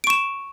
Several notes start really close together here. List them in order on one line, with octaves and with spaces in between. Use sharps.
D7 C#6 E7